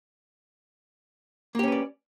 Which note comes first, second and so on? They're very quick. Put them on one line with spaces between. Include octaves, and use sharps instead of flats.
A#3 G4 C#4 B4 D5